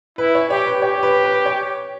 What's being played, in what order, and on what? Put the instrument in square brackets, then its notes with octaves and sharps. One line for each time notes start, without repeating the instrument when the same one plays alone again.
[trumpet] E4 [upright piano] B4
[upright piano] C#5
[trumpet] G4 [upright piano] C#5
[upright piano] B4
[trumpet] G4 [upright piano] C#5
[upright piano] B4
B4
C#5